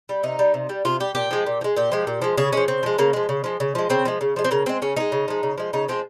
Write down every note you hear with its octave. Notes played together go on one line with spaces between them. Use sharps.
G3
C3 D#4
G3
C3
G3
C3 F4
G3 G4
A#2 G4
F3 G#3
A#2
F3
G#3
A#2 G4
F3 G#3
A#2
F3 G#3
C#3 G#4
F3 G#3 C#4
C#3 C4
F3 G#3
C#3 A#3
F3 G#3
C#3
F3 G#3
C#3
F3 G#3
C#3 C4
F3 G#3
C#3
F3 G#3
C4
C#3 A#3
F3 G#3 C4
C#3 C#4
F3 G#3 D#4
C#3
F3 G#3
C#3
F3 G#3
C#3 D#4
F3 G#3 C4